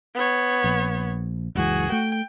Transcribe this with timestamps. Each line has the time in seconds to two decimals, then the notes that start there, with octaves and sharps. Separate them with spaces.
0.14 B3 C#5
0.64 A#1
1.55 F#1 C#2 E3 F#4 G#4
1.92 A3 G5